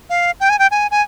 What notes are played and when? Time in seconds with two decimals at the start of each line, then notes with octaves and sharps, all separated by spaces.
0.10 F5
0.40 G5
0.49 G#5
0.59 G5
0.71 G#5
0.91 G#5